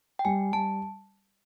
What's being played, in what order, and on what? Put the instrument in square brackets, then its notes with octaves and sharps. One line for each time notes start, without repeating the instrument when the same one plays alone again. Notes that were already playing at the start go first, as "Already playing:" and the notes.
[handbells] G5
[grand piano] G3 [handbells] G#5
[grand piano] G3 [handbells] A5